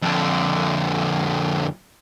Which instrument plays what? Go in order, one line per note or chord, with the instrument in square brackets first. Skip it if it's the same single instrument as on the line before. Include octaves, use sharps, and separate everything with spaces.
[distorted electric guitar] F2 D3